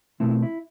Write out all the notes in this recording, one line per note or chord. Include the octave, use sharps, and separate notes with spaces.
B2 A3 C4 E4
E4